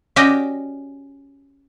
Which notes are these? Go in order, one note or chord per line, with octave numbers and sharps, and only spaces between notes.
C#4 F#4 G4 D5 D#5 G5